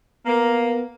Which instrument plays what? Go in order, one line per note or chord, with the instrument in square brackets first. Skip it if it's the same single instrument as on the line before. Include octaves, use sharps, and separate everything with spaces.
[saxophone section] A#3 [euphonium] B3